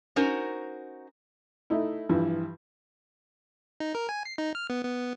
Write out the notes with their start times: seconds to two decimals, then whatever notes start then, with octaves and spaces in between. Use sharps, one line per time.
0.16 C#4 D#4 F#4 A#4 C5
1.70 A3 D#4 E4
2.09 G2 E3 F3
3.80 D#4
3.95 A#4
4.09 G#5
4.25 C7
4.38 D#4
4.55 F6
4.70 B3
4.83 B3